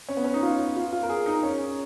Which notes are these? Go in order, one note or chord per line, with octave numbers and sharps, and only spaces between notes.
C#4
B3
C#4
D#4
F4
F4
F4
A#4
G#4
D#4
C#4